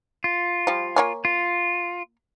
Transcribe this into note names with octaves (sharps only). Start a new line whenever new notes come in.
F4
F3 G3
A#3 C#5 G#5
F4